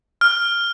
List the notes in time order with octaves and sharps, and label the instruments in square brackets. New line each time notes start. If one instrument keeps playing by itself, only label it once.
[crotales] F6